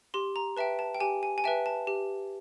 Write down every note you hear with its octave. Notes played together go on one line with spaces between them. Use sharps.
G4 C6
A#5
B4 E5 G5 A5
A5
G5
G4 G#5
G#5
G#5
B4 E5 G5 A5
A5
G4